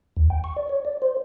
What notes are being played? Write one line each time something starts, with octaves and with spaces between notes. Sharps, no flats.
D#2
G5
C#6
D5
C#5
D5
C5